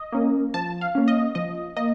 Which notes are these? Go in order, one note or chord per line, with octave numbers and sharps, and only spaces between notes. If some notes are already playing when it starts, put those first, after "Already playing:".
Already playing: D#5
A#3 C#4
F3 A5
F5
A#3 C#4
D#5
F3 D#5
A#3 D#5